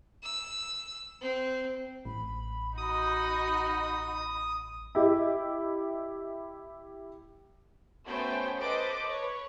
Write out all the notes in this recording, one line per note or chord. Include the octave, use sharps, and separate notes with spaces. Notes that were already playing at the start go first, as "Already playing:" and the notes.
E6
C4
A1 B5
D#4 F#4 D#5 D#6
E4 G4 D#5
A3 B3 C#4 F#4 C5 G5
A4 B4 C5 D#5 D6 D7
B4 C#5